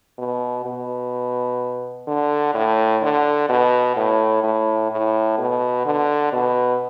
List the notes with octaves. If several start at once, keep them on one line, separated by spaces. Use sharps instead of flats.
B2
B2
D3
A2
D3
B2
A2
A2
A2
B2
D3
B2